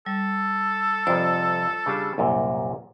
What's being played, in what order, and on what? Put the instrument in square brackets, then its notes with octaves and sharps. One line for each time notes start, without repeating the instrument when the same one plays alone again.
[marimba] G3 [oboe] A4
[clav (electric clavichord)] F2 C3 F3 [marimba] F4 C5 D5
[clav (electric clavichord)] C#3 G3 D4
C2 F#2 A#2